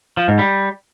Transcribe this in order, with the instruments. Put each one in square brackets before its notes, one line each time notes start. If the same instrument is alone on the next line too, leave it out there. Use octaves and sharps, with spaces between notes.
[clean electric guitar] F3
G#2
G3